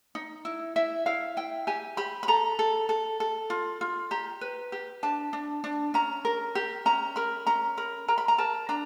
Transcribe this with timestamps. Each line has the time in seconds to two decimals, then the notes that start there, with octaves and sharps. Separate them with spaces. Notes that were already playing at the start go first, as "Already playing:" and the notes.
0.15 D#4
0.45 E4
0.76 E4 E5
1.06 E4 F5
1.37 E4 G5
1.67 G4 G#5
1.97 G4 B5
2.23 B5
2.28 A4 A#5
2.59 A4
2.89 A4
3.20 A4
3.50 F4
3.81 F4
4.11 G4 A#5
4.41 B4
4.72 G4
5.03 D4 A5
5.33 D4
5.64 D4
5.94 C#4 A#5
6.25 A#4
6.55 G4
6.86 C#4 A#5
7.16 A#4 B5
7.47 C#4 A#5
7.78 A#4 B5
8.08 A#4 A#5
8.18 B5
8.28 A#5
8.38 A#4 A5
8.69 D4 A#5